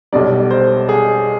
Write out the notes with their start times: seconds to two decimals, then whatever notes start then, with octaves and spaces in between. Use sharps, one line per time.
0.13 B1 B2 G3 D5
0.51 C5
0.89 G#4